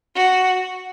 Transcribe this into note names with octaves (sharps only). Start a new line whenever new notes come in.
F#4